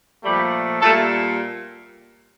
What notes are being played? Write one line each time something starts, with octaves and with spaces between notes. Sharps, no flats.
A#2 F3 G3 A3 G4
A#2 G3 A3 A4